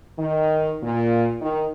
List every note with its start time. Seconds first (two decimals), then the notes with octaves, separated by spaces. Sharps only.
0.18 D#3
0.82 A#2
1.41 D#3